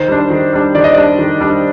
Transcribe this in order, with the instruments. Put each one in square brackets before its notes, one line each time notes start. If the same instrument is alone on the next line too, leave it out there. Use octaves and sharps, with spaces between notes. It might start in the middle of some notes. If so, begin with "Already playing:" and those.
Already playing: [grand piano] D#3 C5
G3 D4
D#3
G3 D4
D#3 D5
D#5
G3 D4 D5
D#3
G3 D4